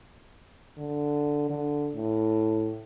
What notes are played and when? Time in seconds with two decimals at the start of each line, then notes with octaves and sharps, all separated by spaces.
0.78 D3
1.50 D3
1.95 A2